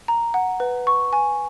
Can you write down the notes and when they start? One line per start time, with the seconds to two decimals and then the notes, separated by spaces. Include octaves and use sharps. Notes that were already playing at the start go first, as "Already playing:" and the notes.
0.08 A#5
0.34 F#5
0.60 B4
0.87 C#6
1.13 G#5